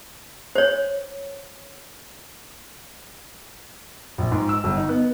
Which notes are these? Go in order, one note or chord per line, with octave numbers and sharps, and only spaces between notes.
C5 C#5
A#1
G#2
E6
G1
D#4
B3